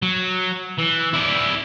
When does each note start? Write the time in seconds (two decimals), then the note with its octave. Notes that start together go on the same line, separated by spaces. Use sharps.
0.02 F#3
0.79 E3
1.14 E4 D5